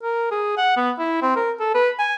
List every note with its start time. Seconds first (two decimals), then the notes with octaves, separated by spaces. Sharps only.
0.03 A#4
0.31 G#4
0.57 F#5
0.77 B3
0.99 E4
1.22 C4
1.36 A#4
1.60 A4
1.75 B4
1.99 G#5